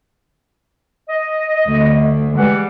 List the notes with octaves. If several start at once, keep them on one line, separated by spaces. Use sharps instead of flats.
D#5
D2
E3 G3 G#3 F#5